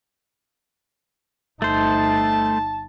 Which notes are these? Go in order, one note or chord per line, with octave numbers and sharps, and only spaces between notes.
G1 A3 D#4 C5 A5